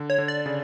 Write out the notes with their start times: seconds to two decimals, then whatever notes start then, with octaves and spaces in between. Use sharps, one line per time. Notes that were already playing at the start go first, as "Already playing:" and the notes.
Already playing: D3
0.10 C#5
0.18 D3
0.28 D5
0.46 C#3